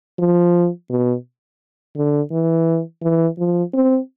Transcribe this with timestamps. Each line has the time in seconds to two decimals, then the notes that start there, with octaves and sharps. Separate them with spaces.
0.19 F3
0.90 B2
1.96 D3
2.31 E3
3.02 E3
3.38 F3
3.74 C4